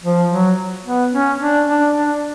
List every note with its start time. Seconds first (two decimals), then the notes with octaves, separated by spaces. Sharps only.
0.03 F3
0.31 F#3
0.85 B3
1.12 C#4
1.40 D4
1.67 D4
1.95 D4